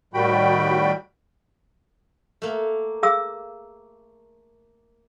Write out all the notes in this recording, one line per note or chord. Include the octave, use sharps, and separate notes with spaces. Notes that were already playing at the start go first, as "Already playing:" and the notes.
A2 D#3 G3 F#4 G5 B5
A3 A#3
G#4 F5 E6